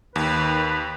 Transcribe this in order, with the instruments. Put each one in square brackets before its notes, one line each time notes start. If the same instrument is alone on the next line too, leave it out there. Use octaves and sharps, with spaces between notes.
[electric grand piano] D#2 [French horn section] D#3 [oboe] B4